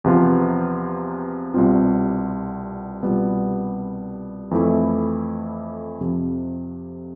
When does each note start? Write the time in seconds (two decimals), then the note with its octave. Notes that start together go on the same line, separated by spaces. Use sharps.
0.04 E2 C3 F3 B3 F4
1.54 C2 B2 G3 C4 F4
3.03 C2 B2 G3 B3 F4
4.51 F2 E3 A3 E4
6.01 F2 C3 F3